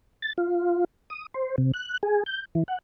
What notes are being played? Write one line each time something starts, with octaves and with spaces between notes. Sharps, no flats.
A6
F4
D#6
C5
C3
F#6
G#4
G6
E3
F#5